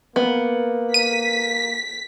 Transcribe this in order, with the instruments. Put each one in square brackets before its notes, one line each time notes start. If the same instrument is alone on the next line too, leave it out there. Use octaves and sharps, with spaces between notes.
[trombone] A#3 [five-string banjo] B3
[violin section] B6 [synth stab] D#7